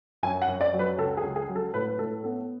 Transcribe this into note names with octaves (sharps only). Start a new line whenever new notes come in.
F#2 G#5
F#5
F#2
D5
F#3
B4
C#2 A4
G#4
C#2
G#4
F#3
A4
A2 B4
B4
A2 A4
B3 A4